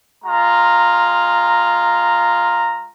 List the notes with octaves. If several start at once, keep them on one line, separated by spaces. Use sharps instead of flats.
G#3 F4 A#5